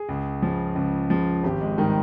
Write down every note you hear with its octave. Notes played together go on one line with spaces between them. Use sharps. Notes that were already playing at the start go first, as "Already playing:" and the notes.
Already playing: G#4
C#2
C#3 F3
C#2
C#3 F3
G#1 G4
G#3
G#2 D#3 G3 G#3